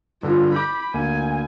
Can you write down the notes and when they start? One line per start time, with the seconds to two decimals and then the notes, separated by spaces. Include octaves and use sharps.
0.23 G2 D3 F4
0.55 B5 D6 G6
0.94 D2 A#3 G#5 D#7